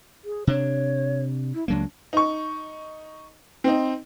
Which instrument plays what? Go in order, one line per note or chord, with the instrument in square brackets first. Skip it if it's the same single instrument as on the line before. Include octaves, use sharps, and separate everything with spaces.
[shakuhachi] G#4
[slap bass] C3 D4 [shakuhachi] C#5
[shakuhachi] E4
[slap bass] C#2 F#3 A#3 [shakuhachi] D4
[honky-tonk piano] D#4 C#6
C4 D#4